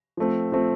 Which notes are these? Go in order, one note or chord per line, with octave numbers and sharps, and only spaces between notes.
F3 A3 C4
F3 A3 C4